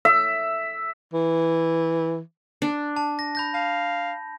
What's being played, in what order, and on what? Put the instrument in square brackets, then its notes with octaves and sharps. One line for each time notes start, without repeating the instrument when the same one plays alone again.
[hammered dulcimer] E5
[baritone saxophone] E3
[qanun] D4
[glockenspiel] A5
A#6
B5 G6 A#6
[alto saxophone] F5 [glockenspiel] A5